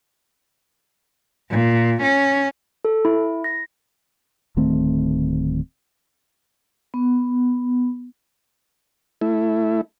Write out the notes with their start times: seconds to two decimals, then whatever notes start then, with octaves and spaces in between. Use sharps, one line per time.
1.51 A#2
2.03 C#4
2.85 A4
3.05 E4
3.44 A#6
4.57 D1 D#3 A3 C4
6.94 B3
9.21 A3 E4